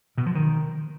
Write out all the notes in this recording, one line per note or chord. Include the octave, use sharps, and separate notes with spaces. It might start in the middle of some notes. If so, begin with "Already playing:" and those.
B2
F3
D#3